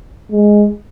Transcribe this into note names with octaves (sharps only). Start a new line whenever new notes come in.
G#3